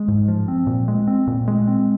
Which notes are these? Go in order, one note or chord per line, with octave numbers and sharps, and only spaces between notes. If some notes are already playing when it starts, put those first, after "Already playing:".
Already playing: G#3
G#2
F3
C4
A#2
G#3
C4
A#2
G#3
C4